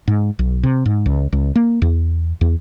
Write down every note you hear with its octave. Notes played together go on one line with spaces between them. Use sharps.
G#2
B1
C3
G#2
C#2
C#2
A#3
E2
E2